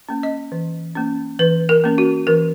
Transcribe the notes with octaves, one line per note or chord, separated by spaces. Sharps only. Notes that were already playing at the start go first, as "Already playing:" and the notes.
A#3 C#4
D#5
E3
A#3 C#4
E3 B4
A#4
A#3 C#4
F#4
E3 A#4